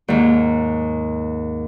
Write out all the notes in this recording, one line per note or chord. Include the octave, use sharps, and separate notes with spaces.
D#2 G#2